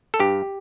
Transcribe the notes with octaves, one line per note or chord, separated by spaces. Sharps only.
A4
G2 G4